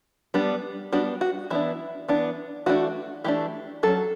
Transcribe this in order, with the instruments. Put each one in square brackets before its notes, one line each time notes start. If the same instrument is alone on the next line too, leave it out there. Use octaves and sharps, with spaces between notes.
[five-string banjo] G3 B3 D4
G3 B3 D4 F#4
F#4
E3 B3 D4 E4
E3 B3 D4
E3 A3 D4 F#4
E3 A3 D4 G4
F#3 C#4 A4